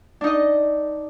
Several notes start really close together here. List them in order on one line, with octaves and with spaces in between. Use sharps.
D4 D#4 D#5